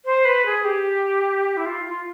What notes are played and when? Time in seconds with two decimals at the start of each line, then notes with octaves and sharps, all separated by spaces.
0.05 C5
0.25 B4
0.46 G#4
0.65 G4
1.57 E4
1.66 F4
1.85 F4